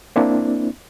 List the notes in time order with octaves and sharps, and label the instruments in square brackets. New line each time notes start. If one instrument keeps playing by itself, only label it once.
[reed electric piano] A#3 C4 D4 E4